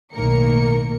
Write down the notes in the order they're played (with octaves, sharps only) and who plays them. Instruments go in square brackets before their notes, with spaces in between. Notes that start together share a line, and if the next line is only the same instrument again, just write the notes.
[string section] B1 A2 D#3 A#3 A#4 C#7